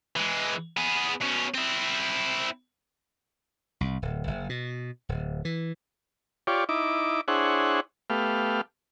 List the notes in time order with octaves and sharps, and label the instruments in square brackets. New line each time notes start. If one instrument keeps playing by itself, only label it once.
[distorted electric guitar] E3 G#3
B3 G#4
B2 C#4
C4 E4
[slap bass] C2
D1
F#1
B2
D1
E3
[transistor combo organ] F4 G4 C#5 D5
D#4 E4 D6
D4 E4 G#4 C5 C#5 F#5
A3 B3 G4 F5